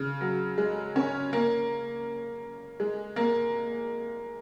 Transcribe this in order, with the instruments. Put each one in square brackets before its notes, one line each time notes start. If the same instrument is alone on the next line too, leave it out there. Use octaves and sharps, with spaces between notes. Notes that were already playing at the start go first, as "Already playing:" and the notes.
Already playing: [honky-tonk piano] C#3
F#3
G#3
C#4
A#3
G#3
A#3